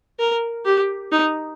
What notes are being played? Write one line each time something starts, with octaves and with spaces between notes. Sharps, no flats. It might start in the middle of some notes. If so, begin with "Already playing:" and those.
A#4
G4
D#4